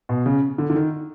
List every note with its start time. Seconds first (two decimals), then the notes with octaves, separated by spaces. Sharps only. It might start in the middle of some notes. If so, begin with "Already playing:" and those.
0.09 B2
0.26 C#3
0.58 D3
0.70 D3
0.75 D#3